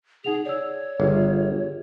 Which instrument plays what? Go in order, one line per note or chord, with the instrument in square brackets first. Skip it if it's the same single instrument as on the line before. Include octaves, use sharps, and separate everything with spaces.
[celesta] D#4 F#5 F7 [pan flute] G#4
[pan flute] C#5 [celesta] D5 E6
[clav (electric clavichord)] G1 [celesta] F4 G4 G#4